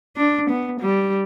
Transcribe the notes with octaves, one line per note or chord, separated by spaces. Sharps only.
D4
B3
G3